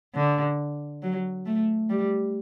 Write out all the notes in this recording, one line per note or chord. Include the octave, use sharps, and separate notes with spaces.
D3
F#3
A3
G3